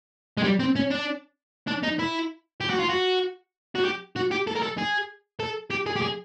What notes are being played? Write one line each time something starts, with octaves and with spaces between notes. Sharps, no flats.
G#3
G3
C4
C#4
D4
D4
D#4
E4
G4
F#4
F4
F#4
F#4
G4
F#4
G4
A4
A#4
A4
G#4
A4
G4
G#4
G4
G#4